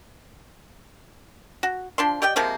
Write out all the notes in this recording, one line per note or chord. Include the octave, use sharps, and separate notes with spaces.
F#4
F3 D4 C6
G4 D5 D#5 G5
C3 F3 G#3 A#3